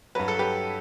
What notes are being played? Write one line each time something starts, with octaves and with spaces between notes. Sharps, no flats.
G2 F#3 B4
A4
G4 B4